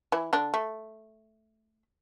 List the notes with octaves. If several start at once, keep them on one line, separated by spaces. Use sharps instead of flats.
E3 E4
D3 D4
A3